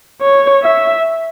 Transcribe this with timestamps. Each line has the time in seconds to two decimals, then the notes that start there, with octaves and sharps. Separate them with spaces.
0.22 C#5
0.63 E5